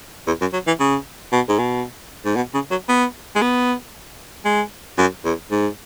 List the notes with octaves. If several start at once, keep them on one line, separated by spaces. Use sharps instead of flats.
E2
F#2
F#3
E3
C#3
B2
G#2
B2
G#2
B2
C#3
F#3
B3
G#3
B3
G#3
F#2
E2
G#2